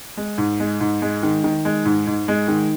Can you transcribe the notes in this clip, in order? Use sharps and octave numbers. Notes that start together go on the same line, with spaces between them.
G#3
G#2
G#3
G#2
G#3
D#3
D#3
G#3
G#2
G#2
G#3
D#3